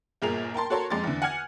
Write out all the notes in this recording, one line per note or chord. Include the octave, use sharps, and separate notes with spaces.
G1 A#2 G#4 A#4 F7
A#4 G5 A5 C6
F#4 A4 A#4 C#5 A5 C6
F2 G#3 C6 D6 A6
E2 D3
F#5 G#5 F6 G#6